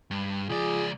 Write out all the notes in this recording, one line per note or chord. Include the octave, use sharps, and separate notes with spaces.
G2
C#2 F3 F4 G#4 D5